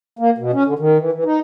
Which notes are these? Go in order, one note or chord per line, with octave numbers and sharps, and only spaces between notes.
A#3
B2
C#4
D3
D#3
E3
E3
D#4